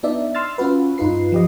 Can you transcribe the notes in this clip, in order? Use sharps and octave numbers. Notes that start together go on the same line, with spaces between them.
B3 D4 D#4 D5 E5
C6 E6 F6 A6
C#4 F4 F#4 B4
G2 D#4 F4 B4 C7
F3 G4 D#5